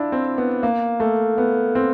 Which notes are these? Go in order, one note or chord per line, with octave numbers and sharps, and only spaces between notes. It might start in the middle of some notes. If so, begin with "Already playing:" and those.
Already playing: D4 E4 F4
C4
B3
A#3
A3
B3
C4